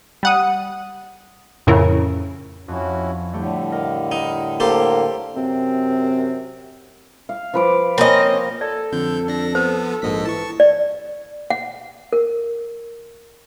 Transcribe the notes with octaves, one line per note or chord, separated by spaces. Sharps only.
G3 F#5 D#6
F2 A2 C#3 E4 A#4
F2 C#4 E4 F#4
A2 D3 G3 A3 G4
A#4 D#5 F5
D#4 E4 A#4
A#3 G4 A4 C5
F#2 C3 C4
F5
F3 B4 D6
A#3 C4 C#4 D#5
A4 D5
F2 D3 G6
D4 A#6
F3 B3 C5
A#1 G#2 D#5 B6
E3 A5 C#6
D5
F#5
A#4